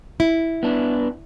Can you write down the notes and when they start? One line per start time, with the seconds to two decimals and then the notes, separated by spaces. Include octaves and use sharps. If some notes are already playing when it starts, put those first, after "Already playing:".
0.20 E4
0.63 B3 D4